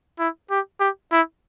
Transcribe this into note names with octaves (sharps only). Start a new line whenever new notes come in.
E4
G4
G4
E4